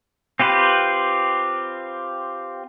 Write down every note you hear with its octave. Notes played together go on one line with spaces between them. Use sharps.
C4 F4 G4 B4